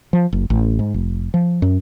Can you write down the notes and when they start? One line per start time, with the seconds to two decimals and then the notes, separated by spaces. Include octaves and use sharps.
0.13 F3
0.33 F#1
0.50 A1
0.79 G#2
0.94 F1
1.34 F3
1.62 F#2